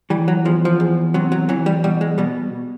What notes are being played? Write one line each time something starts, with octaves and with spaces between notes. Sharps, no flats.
E3 G3
F#3
E2 F3
F3
E2
C3 F#3
F#3
E3 F#3
G3
B2 G3
G#3
B2 G3